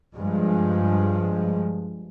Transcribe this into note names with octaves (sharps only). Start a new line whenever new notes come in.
G2 F3 G#3